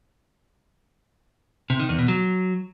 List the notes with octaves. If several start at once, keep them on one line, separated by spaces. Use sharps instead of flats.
C3
D#3
E2
B2
F#3